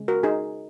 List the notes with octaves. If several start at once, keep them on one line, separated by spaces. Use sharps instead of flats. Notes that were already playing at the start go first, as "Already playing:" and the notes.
Already playing: C#3 G#3 C#4
F#4 A#4
D#4 G#4